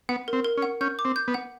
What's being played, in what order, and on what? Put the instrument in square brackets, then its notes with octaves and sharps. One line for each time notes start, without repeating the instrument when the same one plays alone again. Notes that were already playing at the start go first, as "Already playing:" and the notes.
[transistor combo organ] B3 [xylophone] F#5
[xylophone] A#4
[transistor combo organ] C4
[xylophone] A#4
[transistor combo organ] C#4
[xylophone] F#5
[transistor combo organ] C#4 [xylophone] G6
[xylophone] D6
[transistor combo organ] C4
[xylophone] G6
[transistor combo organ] B3
[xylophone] F#5